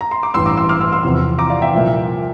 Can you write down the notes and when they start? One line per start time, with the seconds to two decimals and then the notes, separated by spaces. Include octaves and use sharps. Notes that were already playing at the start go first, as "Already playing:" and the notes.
0.01 A#5
0.11 C6
0.23 D6
0.34 A1 G2 E3 G3 C6 E6
0.46 A#5 D6
0.57 C6 E6
0.69 D6 F6
0.81 C6 E6
0.92 C6 E6
1.04 E2 C3 F3
1.38 A#5 D6
1.50 D5 F5
1.62 E5 G5
1.73 C2 A#2 F3